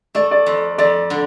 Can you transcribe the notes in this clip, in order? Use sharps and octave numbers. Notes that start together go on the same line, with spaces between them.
A3 D5
D5
F2
F2 D5
D3